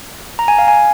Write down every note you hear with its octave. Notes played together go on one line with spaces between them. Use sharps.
A#5
G#5
F5
G#5